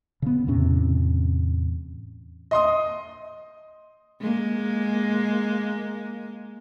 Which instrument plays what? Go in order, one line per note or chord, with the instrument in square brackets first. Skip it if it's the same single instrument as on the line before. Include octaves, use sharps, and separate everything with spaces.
[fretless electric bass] C#3 B3
E2 A2 C3 C#4
[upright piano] D#5 C6 D#6
[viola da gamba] G#3 A#3